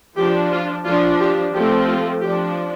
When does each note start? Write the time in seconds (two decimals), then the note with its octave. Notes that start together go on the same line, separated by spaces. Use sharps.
0.17 F3 D4 G4
0.52 F4
0.85 F3 D4 F4
1.20 G4
1.53 F3 A3 C4 G4
1.87 F4
2.21 F3 D4 G4